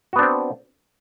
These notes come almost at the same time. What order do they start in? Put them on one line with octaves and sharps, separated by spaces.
F#4 B3 D4 C4